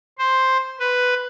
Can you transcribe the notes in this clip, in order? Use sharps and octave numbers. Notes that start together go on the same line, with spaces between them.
C5
B4